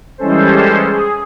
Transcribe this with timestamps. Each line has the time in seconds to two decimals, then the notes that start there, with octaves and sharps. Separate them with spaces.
0.18 E3 G3 G#3 C#4 A4 C5
0.85 G#4